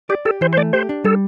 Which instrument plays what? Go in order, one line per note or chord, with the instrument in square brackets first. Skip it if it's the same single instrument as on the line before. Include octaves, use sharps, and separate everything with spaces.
[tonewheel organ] G4 [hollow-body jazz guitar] D5
[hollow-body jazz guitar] G4 [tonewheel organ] A4
[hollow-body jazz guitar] E3 [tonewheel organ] C5
[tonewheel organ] C5
[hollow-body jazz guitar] A3 [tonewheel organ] D5
[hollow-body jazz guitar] G4 [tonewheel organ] C5
[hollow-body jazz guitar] D4
[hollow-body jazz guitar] G3 [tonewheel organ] A4